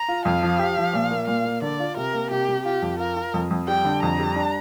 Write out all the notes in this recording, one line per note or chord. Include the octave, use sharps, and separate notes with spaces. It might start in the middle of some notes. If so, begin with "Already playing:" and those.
Already playing: A#5
F4
F2 F5
F3
G4
F3
A#2
A#3
A#2 F5
A#3
D3 D5
F4
C3 A#4
A#3
C3 G4
C3
F4 G4
F2
F4 A#4
F4
F2
F2
G3 G5
D3
F2 A#5
G3
D4